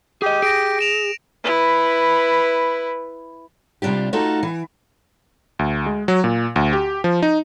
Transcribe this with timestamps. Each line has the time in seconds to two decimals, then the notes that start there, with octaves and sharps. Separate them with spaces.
0.22 G4 G#4 D#5
0.42 G#4 A#6 D7
0.79 D7 E7 F7
1.44 E4 B4
3.82 C3 G3 D4 F4 G4
4.13 A3 D#4 F4 F#4 A4
4.43 E3
5.59 D2
5.86 G#3
6.08 F#3
6.24 A#2
6.56 D2
6.73 G4
7.04 F3
7.22 D#4